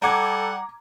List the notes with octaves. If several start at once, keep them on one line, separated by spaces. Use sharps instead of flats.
G3 A4 F#5 A#5 D6 G#6